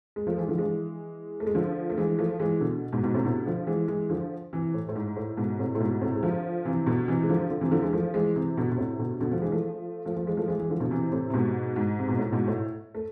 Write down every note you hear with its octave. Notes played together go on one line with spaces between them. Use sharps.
G#3
F3 A3
E3 G#3
D3 F3
E3 G#3
A3
G#3
D3 F3
A3
E3 G#3
F3 A3
E3 G#3
B2 D3
G#2 B2
G#2 B2
A2 C3
B2 D3
D3 F3
E3 G#3
E3 G#3
D3 F3
C3 E3
A2
A2
G#2
A2
G#2 B2
A2 C3
A2
G#2 B2
A2 C3
G#3
D3 F3
C3 E3
B2 D3
C3 E3
G#3
D3 F3
D3 F3
C3 E3
D3 F3
E3 G#3
F3 A3
E3 G#3
C3 E3
B2 D3
B2
A2 C3
B2 D3
B2 D3
D3 F3
E3 G#3
F3 A3
F3 A3
F3 A3
E3 G#3
F3 A3
E3 G#3
E3 G#3
D3 F3
B2 D3
C3 E3
A2 C3
C3
G#2 B2
G#2
C3
B2
A2
G#2 B2
A2
A3